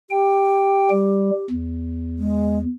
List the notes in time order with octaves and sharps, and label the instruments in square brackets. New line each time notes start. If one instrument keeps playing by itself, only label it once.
[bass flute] G4 [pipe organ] G5
[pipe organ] G3
E2
[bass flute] G#3